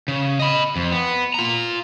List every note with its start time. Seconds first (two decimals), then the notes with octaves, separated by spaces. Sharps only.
0.08 C#3
0.39 D#5 B5
0.76 F2
0.92 B3
1.34 F4 A#5